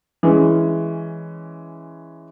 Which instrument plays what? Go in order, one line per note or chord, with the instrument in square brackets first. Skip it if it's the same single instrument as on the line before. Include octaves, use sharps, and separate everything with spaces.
[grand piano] E3 G#3 C#4